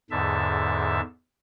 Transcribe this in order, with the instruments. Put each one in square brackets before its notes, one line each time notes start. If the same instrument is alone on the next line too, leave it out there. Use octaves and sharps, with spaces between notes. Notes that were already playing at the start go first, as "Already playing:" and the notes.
[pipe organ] E2 G#2 D3 E5 A5